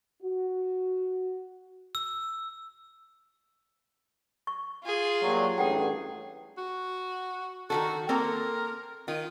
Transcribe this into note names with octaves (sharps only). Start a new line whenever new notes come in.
F#4
E6
C#6
F4 G#4
A#2 F#3 G3
A1 G2 G#4 A4 F#5 G5
F#4
D#3 E3 F#4 A4
A#3 C4 A4 A#4
D#3 F4